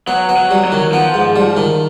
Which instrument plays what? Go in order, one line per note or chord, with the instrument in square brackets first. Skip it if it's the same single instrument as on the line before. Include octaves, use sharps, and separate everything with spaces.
[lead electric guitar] F#3 [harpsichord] B3
[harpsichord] B3
[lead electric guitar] F#3
[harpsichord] G3
[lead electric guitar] F#3
[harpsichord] D#3
[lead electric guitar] F3 [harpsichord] B3
[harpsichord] G#2
G3
D#3